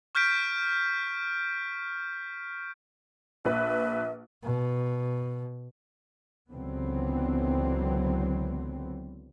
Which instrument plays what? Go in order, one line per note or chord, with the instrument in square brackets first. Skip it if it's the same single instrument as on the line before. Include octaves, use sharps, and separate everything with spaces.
[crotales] C#6 F6 G6 B6 D7
[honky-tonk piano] A#1 B4 [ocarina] E5
[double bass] B2
[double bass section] C#2 D3 E3 F#3 B3 C4